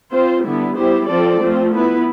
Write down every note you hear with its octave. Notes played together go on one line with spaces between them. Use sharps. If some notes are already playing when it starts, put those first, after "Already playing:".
C4 F4 C5
D3 G3 B3 E4
G3 B3 E4 G4 C5
F3 C4 F4 A4 D5
F3 A3 C4 F4
B3 E4 B4